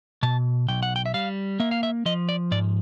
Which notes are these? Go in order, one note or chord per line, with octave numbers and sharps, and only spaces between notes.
B2 A5
B1 G5
F#5
G5
E5
G3 F5
A#3 E5
F5
E5
F3 D#5
D5
G#2 D5